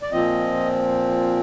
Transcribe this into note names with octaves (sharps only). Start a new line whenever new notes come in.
D5
A#2 F3 C4 D#5